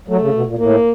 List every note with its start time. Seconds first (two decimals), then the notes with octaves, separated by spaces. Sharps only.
0.08 F#3 A3
0.21 C#3
0.34 B2
0.46 A#2
0.58 A2 A#3